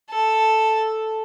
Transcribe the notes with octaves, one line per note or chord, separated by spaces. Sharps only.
A4